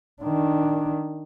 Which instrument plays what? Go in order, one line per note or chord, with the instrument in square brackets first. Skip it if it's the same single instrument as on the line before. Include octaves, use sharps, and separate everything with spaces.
[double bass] D#3 D4